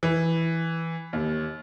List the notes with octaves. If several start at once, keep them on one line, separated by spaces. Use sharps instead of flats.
E3
D#2